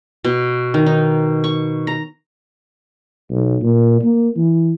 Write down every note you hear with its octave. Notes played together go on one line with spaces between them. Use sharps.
B2
D#3
D#4
C#6
A#5
B1
A#2
A#3
E3